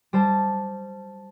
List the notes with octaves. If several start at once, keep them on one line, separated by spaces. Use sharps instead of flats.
G3 C5 A5